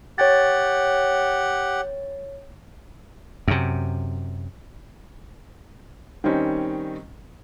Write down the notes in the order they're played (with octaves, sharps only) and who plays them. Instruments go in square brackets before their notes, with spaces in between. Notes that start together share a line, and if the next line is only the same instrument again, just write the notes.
[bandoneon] G4 F#5 [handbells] C#5 G5 A6
[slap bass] F#2 C3
[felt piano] D#3 G3 C4 C#4 D#4